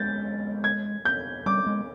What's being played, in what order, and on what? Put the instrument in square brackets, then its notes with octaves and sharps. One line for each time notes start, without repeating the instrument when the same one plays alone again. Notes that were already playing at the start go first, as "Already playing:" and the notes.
Already playing: [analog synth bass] G#3 [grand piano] G6 A6
[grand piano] G#6
G6
[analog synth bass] G3 [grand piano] D6
[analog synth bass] G#3